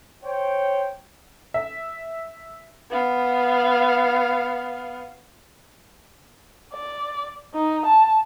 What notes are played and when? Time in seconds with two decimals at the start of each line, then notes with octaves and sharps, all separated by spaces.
0.24 C5 C#5 G5
1.54 E5
2.91 B3 F5
6.73 D5
7.54 D#4
7.86 A5